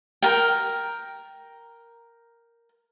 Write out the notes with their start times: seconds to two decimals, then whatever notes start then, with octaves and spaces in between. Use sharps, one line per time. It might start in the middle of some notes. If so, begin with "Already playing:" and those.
0.22 A#4 G5